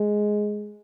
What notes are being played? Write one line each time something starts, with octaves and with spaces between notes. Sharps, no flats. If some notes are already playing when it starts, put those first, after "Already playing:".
Already playing: G#3